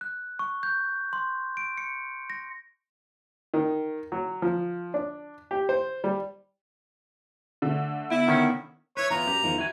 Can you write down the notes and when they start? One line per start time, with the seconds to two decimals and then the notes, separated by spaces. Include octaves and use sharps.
0.01 F#6
0.39 C#6
0.63 G6
1.13 C6
1.57 D7
1.78 C#7
2.30 A#6
3.54 D#3
4.12 F#3
4.42 F3
4.94 D4
5.51 G4
5.69 C5
6.04 G3
7.62 D3 A3
8.10 B3 E4 F#5
8.28 D#3 C#4
8.97 E4 B4 C#5
9.10 E3 B3 F4 A#5
9.27 F#2 G4
9.43 E2 D#3 F3
9.58 E4 F#4 G#5